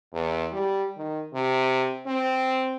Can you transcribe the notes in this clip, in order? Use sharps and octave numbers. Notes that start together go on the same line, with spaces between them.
E2
G3
D#3
C3
C4